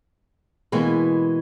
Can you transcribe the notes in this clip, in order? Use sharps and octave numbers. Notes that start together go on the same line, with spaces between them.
B2 E3 G#3 A#3